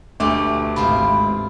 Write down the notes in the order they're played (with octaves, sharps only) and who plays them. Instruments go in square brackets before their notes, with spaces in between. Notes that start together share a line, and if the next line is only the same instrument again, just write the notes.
[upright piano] D2 [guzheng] B2 G3 A3 [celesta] D6
[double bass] G#1 [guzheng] C3 B3 F4 [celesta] B5